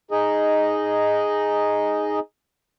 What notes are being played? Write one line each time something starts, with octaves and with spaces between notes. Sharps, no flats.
D#4 G#4 D#5